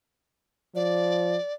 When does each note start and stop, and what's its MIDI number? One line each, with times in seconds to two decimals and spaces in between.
0.75 1.36 53
0.75 1.54 74